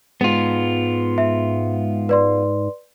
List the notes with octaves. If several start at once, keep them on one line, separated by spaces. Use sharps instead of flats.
G#2 B3 F4
E5
B4 D5 C6